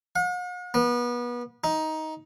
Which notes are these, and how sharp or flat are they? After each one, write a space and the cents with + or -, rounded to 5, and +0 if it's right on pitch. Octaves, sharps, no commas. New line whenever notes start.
F#5 -45
B3 -30
D#4 +15